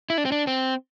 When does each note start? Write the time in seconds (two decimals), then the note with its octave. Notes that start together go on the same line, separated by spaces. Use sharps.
0.10 E4
0.18 D4
0.25 C4
0.32 D4
0.47 C4